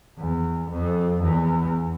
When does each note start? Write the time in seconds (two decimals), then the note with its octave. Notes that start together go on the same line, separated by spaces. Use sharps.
0.18 E2
0.70 F2
1.21 E2